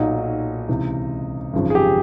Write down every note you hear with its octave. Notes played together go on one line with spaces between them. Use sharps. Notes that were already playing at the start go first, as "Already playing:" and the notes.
Already playing: B1 A#2 F#3 D#4
C#2 C3 E3
G#1 F#2 C#3 F3
G#4
G4